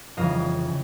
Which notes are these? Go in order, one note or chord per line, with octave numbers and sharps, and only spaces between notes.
F1 F2 C#3 E3 G3 D#5 F5
C#3